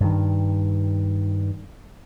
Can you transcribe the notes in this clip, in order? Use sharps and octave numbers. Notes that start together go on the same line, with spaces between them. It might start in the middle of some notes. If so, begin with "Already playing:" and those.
G2 D#3